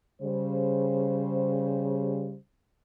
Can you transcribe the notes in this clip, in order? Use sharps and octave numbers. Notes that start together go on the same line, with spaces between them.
C#3 G3 C5